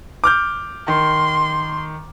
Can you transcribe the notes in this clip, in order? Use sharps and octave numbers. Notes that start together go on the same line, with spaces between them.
D6 F6 G6
D#3 C6